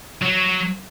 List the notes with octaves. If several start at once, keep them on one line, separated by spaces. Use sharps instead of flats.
F#3